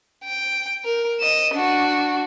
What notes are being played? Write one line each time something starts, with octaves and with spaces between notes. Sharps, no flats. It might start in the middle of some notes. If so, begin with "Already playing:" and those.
G5
A#4
D#5 E7
D4 F#4